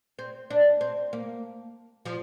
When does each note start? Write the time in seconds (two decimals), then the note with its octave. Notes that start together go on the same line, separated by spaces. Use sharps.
0.19 C4
0.50 D4
0.81 C4
1.13 A#3
2.05 F3